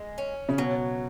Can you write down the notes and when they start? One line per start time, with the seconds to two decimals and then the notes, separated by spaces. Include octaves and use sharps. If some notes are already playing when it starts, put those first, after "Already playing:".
Already playing: G#3
0.18 C#4
0.49 C#3
0.58 B2 F#3